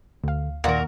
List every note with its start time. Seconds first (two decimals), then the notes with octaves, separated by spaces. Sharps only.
0.24 D2 D3 F5
0.64 D#2 A#2 D#3 A#3 F#4 A#4